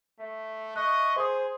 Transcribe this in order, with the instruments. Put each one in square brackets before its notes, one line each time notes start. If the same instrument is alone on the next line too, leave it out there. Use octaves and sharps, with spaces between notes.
[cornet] A3 [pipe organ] E5
[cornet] D#5 [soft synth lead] C#6 [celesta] F#6
[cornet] G#4 [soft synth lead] C5 [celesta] C6 D#6